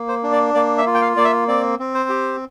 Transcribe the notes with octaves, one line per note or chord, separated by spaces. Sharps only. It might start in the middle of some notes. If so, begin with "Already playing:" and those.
Already playing: A#3
C5
D4
D5
A#3 D5
E5
F4
G5
F5
A#3 D5
E5
C4 D5
C4
C5
G4